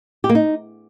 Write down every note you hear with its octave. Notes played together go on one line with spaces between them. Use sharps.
G4
A#3
D#4